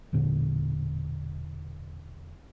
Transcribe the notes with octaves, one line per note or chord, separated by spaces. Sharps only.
E1 A#2 D3 D4